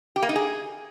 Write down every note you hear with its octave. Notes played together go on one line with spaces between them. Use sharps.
G4
A#3
D#4
G#4